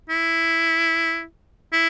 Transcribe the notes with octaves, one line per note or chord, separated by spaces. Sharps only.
E4
E4